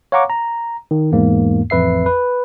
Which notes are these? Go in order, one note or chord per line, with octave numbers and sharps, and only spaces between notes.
C#5 F5 F#5 A#5 C#6 D6
A#5
D#3
E2 G#2 A#3
A1 F2 B4 E5 C7
B4